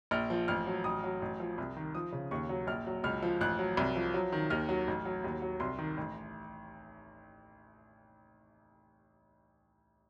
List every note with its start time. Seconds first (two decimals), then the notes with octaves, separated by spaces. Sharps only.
0.11 A#1 F6
0.30 F3
0.48 A1 F6
0.67 F#3
0.84 A1 D#6
1.04 F#3
1.22 A1
1.40 F3
1.58 C2
1.77 D#3
1.95 F3 D#6
2.12 C#3
2.31 D#2 C#6
2.49 F#3
2.67 A#1 F6
2.87 F#3
3.04 C#2 F6
3.23 F3
3.41 A1 F#6
3.59 F#3
3.77 C2
3.96 F3
4.14 F#3
4.32 D#3
4.50 D#2 F6
4.69 F#3
4.87 A1
5.05 F#3
5.24 D#2
5.42 F#3
5.60 C2 C6
5.78 D#3
5.97 A1